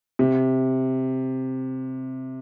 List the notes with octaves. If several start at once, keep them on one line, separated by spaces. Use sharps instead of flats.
C3